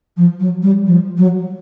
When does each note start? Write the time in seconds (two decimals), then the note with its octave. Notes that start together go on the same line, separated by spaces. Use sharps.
0.17 F3
0.40 F#3
0.63 G3
0.86 F3
1.17 F#3